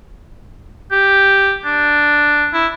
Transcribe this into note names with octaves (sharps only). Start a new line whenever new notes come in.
G4
D4
E4